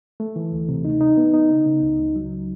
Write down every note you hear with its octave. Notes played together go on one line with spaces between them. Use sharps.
A3
E3
D2
C3
D#4
D#4
B3
D#4
C#3
C#3
C#2
C#2
F#3